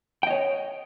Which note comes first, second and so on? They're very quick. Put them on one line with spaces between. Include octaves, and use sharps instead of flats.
G5 D#5 C#5